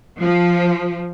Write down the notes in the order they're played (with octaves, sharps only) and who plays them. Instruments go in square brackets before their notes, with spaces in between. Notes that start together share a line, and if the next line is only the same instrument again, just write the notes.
[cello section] F3